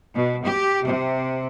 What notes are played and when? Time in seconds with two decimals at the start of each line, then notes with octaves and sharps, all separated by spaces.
0.15 B2
0.45 G4
0.84 C3